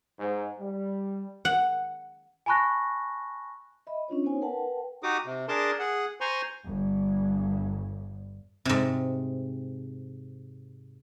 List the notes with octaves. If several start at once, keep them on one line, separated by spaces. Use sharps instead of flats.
G#2
G3
F#5
G#5 A5 B5 C#6 F#6 A#6
D#5 E5 B5
C#4 D4 F4 C#5
B3 D#4 C5 C#5 G#5
A#4 B4 F#5 G5 A5
D#4 F#4 G4 D6 D#6
C3
D4 G#4 A#4 A5 C6 D6
G#4 F#5
C5 G#5 A#5 C6 C#6
G1 G2
G#2 C3